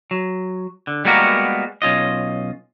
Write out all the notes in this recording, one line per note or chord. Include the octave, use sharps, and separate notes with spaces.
F#3
D3
G3 G#3 A#3 B3 F#4 A#4
B1 C#4 F4 D#5